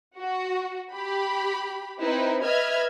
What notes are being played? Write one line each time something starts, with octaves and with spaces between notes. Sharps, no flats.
F#4
G4 B5
C4 D#4 E4 B4
B4 D#5 E5 F6 G#6